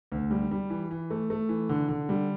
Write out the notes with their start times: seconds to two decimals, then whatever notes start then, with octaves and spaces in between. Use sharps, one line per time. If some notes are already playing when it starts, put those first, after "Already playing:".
0.12 D2
0.31 G3
0.51 G3
0.70 E3
0.91 E3
1.10 A3
1.30 A3
1.49 E3
1.69 D3
1.89 D3
2.09 G3